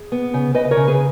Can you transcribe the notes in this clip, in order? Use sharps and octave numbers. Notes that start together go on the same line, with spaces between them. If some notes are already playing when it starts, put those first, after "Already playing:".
Already playing: G#4
B3
C#3
C#3 B4 D#5
B4
A#4 C#5
C#3
G#4 B4